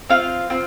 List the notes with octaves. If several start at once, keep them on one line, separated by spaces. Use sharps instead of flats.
C4 F4 F5
C4 F4